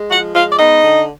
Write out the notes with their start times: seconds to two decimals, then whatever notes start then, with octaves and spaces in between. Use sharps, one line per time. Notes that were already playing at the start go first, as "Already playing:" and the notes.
Already playing: G#3
0.11 F3 F#4 F#5
0.35 G#3 F4 F5
0.52 D5
0.58 B3 D#4 D#5
0.83 D3